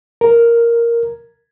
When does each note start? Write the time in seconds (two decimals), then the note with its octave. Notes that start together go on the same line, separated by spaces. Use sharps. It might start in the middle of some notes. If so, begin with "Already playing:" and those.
0.21 A#4